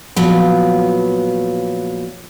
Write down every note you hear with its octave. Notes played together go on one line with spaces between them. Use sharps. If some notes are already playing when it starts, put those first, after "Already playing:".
A#2 F3 F#3 B3